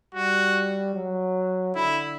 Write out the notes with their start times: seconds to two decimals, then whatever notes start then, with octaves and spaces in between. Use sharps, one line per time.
0.15 G3 F#4
0.94 F#3
1.75 D3 E4